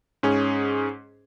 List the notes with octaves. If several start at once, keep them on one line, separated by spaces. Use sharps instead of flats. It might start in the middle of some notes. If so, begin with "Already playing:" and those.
G#2 C#4 G#4